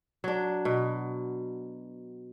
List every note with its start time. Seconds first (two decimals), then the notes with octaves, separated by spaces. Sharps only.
0.24 F#3 D4
0.65 B2